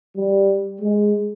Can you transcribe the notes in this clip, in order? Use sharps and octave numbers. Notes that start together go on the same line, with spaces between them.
G3
G#3